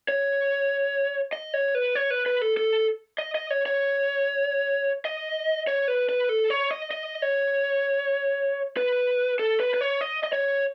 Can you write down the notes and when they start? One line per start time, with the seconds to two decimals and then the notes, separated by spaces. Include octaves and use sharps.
0.08 C#5
1.33 D#5
1.54 C#5
1.75 B4
1.95 C#5
2.10 B4
2.26 B4
2.42 A4
2.57 A4
3.18 D#5
3.35 D#5
3.50 C#5
3.66 C#5
5.05 D#5
5.67 C#5
5.88 B4
6.09 B4
6.29 A4
6.50 C#5
6.71 D#5
6.91 D#5
7.22 C#5
8.77 B4
9.39 A4
9.60 B4
9.74 B4
9.81 C#5
10.01 D#5
10.23 D#5
10.33 C#5